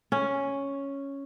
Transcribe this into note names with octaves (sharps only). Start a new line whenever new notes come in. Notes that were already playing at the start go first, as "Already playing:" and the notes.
C#4